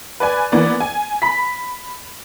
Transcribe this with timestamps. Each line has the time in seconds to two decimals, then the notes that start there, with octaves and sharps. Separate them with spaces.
0.20 B4 D5 G#5
0.52 E3 A#3 B3 D5
0.80 G#5
1.22 B5 B6